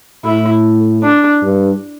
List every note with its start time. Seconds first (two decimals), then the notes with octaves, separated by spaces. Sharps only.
0.25 A2 E4
1.03 D4
1.43 G2